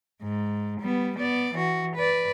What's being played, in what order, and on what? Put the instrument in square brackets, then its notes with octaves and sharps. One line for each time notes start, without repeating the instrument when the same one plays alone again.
[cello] G#2
G3 B3
B3 D5
E3 F#4
B4 D5